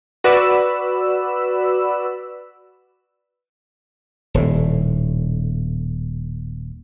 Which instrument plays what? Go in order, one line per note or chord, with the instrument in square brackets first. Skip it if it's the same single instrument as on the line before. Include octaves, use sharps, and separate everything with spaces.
[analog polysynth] F#4 B4 D5 B5 E6
[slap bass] D#1 A2